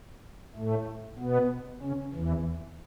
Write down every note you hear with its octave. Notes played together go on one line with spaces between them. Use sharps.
A2 A3
B2 B3
C#3 C#4
E2 E3